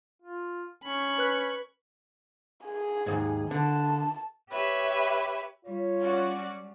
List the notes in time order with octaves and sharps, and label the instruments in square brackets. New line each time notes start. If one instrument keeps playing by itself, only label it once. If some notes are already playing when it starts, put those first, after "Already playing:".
[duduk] F4
[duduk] C#4 [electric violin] B5 C#6
[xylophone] B4 F#6
[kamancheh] G#4
[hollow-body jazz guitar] D#2 G#2
[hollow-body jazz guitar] D3 [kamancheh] A5
[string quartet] G4 B4 C#5 E5
[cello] G3 [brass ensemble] F4 C#5
[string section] C#4 F#4 D5